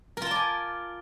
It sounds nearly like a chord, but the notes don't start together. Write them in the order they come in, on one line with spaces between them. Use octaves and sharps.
A#4 F4 A5 D5 G#5